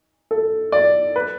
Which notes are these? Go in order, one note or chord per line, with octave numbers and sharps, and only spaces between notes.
A4
D5
B4